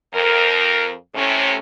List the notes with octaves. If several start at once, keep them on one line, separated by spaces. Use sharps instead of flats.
F2 A#4
A2 C3 C#4